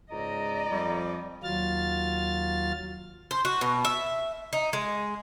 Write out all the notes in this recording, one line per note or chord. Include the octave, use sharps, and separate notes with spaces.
C#2 G#2 D5 D#5 A#5
F2 G3
D#2 F#3 F4 F6 A6
C5
F#4
B2
E5
D#4
G#3